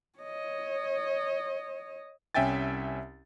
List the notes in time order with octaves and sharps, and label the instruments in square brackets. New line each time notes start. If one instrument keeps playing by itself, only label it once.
[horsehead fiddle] C#5 D#5
[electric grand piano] C2 C#4 E5 G5 G#5 A6